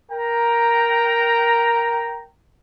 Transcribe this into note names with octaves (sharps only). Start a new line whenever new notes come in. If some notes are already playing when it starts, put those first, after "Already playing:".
A#4 G5 A#5